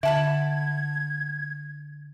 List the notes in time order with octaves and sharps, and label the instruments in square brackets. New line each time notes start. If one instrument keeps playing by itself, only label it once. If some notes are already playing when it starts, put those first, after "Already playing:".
[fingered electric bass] D3 [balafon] E5 [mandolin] F#5 A5 B5 [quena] G#6